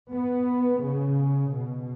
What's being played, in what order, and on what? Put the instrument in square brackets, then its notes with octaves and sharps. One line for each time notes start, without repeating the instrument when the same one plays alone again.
[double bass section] B3
C#3
B2